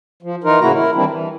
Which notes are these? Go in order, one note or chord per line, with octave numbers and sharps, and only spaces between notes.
F3
E3 D#4 F4 A#4
A2 C#3 A#3 E4 F#4 A#5
E4 A#4
D#3 E3 G3 C4 D4 E4
E3